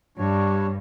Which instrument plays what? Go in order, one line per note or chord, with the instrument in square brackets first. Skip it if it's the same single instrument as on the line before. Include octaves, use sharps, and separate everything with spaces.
[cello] G2 [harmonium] G3 D4 C#5